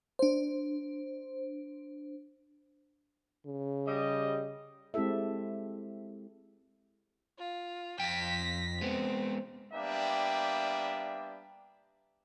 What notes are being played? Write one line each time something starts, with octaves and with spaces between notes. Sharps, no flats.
D4 C5
C#3
G3 D#5
G#3 C4 E4 G4 A4 E5
F4
F2 G5 A#6 B6
G#3 B3 C4
G3 A#3 B3 D4 E5 G5